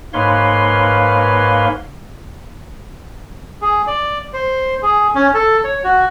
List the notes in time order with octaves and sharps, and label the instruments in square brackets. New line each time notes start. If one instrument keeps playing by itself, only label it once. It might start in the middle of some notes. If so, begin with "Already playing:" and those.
[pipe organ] G#2 A#3 B4 C#5 F5 C6
[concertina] G#4
D5
C5
G#4
C#4
A4
C#5
F#4